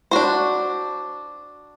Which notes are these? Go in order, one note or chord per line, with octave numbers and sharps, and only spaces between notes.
D4 F#4 C5